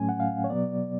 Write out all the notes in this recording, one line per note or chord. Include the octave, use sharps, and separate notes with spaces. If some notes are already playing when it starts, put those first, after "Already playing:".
Already playing: A2 F#3 A3 C#4 G#5
F#5
F5
C#5
B2 F#3 B3 D5